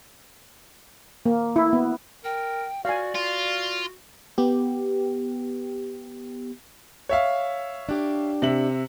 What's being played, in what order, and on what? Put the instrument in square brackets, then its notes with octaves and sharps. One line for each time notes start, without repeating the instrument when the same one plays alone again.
[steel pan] A#3
E4
B3
[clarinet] A#4 [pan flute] G5
[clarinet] F#4 [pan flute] D5 [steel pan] F5 G#5
[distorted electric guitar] F4 [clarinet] F#4
[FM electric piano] B3 G4
[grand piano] C#5 E5 F5
[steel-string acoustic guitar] D4 G4
[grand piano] C3 E5 F#7